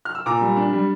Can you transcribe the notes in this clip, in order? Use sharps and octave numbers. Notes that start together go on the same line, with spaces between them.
F6
E6
A#2 A#5 D6
G3
D4
G3